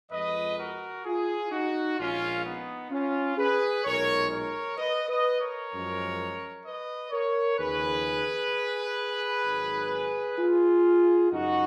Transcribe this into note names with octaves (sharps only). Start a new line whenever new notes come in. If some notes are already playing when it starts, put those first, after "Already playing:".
F2 F3 G#3 B4 D#5
F#4 A#4
F4 G#4
D#4 F#4
A#1 A#2 G#3 C#4 F4
B3 D#4
C#4 F4
G#4 B4
B1 A#2 G#3 A#4 C#5
A#4 C#5
B4 D#5
B4 D#5
A#4 C#5
F#2 F3 G#3
B4 D#5
A#4 C#5
D#2 C#3 F3 G#4 B4
G#1 G#2 F#3
F4 G#4
F#2 C#3 G#3 D#4 F#4